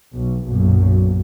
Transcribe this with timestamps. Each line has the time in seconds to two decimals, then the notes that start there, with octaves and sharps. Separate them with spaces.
0.12 B1
0.45 B1 F#2 A#2